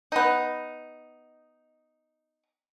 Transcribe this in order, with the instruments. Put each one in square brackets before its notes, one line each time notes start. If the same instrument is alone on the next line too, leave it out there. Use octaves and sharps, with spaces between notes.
[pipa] B3 D#4